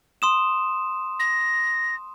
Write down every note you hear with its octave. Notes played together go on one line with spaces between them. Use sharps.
C6 D#6 E7
A#6